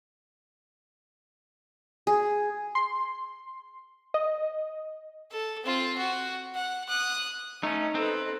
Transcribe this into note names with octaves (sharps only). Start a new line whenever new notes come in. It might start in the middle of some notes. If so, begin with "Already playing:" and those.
G#4
C6
D#5
A4
C4 F4
F#4
F#5
D#6 F#6
A3 C#4 D#4
C4 A4 B4